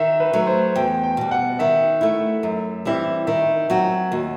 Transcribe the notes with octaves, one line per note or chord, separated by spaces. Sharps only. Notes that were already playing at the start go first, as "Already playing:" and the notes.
Already playing: D#3 E5
B4
F#3 A3
C5
E2 G5
G5
B2 G3
F#5
D#3 E5
A3 E4
F#2
E3 G3 C4 E4
D#3 E5
F#3 C4 F#4
D#2